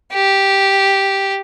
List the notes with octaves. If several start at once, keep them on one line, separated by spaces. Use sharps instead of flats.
G4